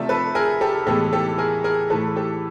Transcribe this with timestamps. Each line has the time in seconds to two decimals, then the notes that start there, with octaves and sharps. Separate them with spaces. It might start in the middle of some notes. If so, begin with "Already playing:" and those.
Already playing: C3 F3 A3 D5 E5
0.09 A4 B4
0.35 G#4 A#4
0.61 G4 A4
0.87 A2 E3 G#3 B3 G4 A4
1.13 G4 A4
1.38 G#4 A#4
1.64 G#4 A#4
1.90 A2 E3 A3 A4 B4
2.16 G4 A4